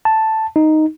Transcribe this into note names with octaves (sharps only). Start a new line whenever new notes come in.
A5
D#4